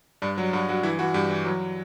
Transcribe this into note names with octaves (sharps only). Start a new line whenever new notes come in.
G2 D4
F#3
G2 F#4
G2 F#4
E3 E4
E3 F#4
G2 G4
E3
F#3